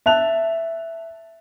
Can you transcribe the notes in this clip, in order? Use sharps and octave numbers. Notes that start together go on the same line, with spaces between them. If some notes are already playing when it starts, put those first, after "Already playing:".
E5 A5 F#6 F7